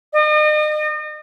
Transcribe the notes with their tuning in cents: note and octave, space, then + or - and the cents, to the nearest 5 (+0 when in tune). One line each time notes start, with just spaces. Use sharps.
D#5 -40